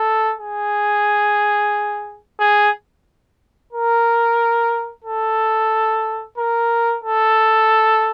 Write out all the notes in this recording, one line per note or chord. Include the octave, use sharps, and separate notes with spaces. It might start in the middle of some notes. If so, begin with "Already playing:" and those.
Already playing: A4
G#4
G#4
A#4
A4
A#4
A4